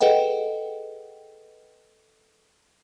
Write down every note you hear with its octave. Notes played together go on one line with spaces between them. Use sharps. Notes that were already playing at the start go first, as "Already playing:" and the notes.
G#4 A4 B4 D#5 F#5 G5